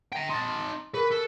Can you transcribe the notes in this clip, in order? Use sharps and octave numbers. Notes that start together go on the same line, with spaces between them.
G5 A#5
D#4 A5 C6
G#4 A#4 B4 F#6
A4